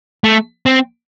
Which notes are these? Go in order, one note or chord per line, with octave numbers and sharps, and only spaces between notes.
A3
C4